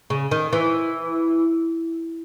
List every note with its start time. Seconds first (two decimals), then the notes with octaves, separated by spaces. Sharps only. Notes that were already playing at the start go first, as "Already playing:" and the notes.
0.10 C#3
0.31 D#3
0.53 E3